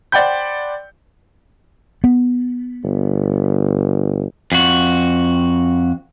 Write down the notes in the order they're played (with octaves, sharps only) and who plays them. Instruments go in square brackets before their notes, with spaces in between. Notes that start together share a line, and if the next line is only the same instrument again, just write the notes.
[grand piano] C5 D5 F#5 G5 B5 G6
[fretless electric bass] B3
[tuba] G1
[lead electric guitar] F2 F#4